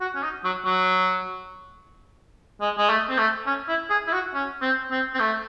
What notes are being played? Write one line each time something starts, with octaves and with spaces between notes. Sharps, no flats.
F#4
C#4
D#4
F#3
F#3
G#3
G#3
A3
C4
A3
C#4
E4
G#4
E4
F#4
C#4
C4
C4
C4
A3